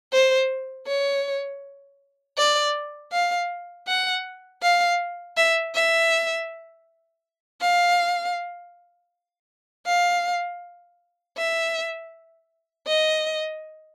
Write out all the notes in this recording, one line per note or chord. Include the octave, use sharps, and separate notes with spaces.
C5
C#5
D5
F5
F#5
F5
E5
E5
F5
F5
E5
D#5